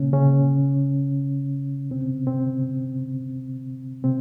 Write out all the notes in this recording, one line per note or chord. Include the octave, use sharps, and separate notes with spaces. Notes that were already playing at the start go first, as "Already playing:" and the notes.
Already playing: A#2 C#3 A#3 C#4
C#3 C#4
C3 C4
C3 C4
C3 C4